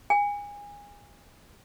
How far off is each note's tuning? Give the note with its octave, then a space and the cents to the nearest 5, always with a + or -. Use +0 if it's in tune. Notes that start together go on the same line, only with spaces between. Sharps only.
G#5 -25